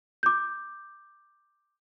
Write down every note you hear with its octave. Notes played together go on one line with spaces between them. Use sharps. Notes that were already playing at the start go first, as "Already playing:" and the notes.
D6 G6